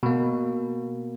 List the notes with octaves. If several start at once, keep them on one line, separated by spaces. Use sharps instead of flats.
B2 A#3